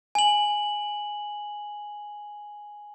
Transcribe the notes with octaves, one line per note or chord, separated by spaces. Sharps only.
G#5 F#7